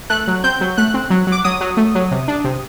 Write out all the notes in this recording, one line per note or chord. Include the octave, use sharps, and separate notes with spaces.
A3 F#6
F#3
C4 G6
F#3
A3 F#6
C4
F#3
F#3
D6
F#3 D#6
F#3
A3
F#3
C3
D4
C3